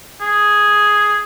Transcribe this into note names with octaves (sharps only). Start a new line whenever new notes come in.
G#4